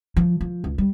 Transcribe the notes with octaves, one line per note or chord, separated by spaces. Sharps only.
F3
F3
C#2
G3